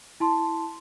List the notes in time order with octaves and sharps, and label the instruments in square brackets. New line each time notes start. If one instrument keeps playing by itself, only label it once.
[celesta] E4 A5 C6